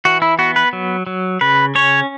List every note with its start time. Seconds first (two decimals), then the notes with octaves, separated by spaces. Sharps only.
0.05 E3 F#4
0.22 E4
0.39 B3 F#4
0.56 B4
0.73 F#3
1.07 F#3
1.41 C#3 B4
1.75 C#4 C#5